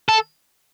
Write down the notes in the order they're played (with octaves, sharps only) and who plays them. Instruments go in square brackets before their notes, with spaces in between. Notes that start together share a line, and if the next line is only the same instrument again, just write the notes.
[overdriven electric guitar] A4